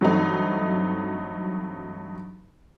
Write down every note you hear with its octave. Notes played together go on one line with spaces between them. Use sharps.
G2 E3 F#3 A3 C4 D#4